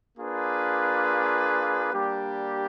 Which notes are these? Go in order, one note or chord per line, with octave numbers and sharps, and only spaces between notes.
A#3 D4 F4 G#4 B4
G3 A#3 D4 G4